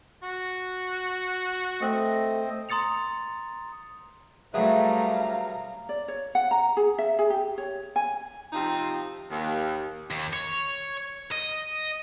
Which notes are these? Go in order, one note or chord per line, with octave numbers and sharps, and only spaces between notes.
F#4
A3 C4 D#5
A#5 C6 D#6 A6 C#7 F7
F#3 G3 A3 G#4 B4 E5 F5 A#5
D5
C#5
F#5
A#5
G#4
E5
G#4
G4
C#5
G#5
C3 F3 C4 D#4
D#2
D#2
C#5
D#5